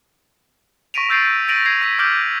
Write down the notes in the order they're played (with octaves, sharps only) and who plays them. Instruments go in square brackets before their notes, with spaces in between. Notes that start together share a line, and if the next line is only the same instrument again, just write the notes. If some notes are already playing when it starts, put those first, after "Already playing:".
[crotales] C#6 A#6 B6 D7 D#7 F7
C#6 E6 G6 A6 C7 D7
A6 A#6 D7 D#7 F7 F#7
G#6 A#6 C7 F7
E6 B6 D#7
D6 F6 G6 D7 F#7